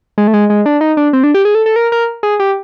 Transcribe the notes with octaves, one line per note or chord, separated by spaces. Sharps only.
G#3
A3
G#3
G#3
D4
D#4
D4
C4
D4
G4
G#4
A4
A4
A#4
A#4
G#4
G4